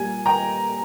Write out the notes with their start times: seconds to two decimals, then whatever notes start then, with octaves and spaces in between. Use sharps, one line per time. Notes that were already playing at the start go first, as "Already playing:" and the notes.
Already playing: A#2 G3 A#3 G#5
0.26 G5 A#5